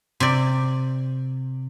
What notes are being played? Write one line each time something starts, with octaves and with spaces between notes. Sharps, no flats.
C3 D5